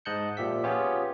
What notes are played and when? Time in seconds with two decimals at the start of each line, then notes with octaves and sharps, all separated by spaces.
0.05 G#2 D#5 A5 F#6 G6 C#7
0.37 A#2 F3 G4 E5 B6
0.64 B3 C#4 F4 G4 G#4 C#5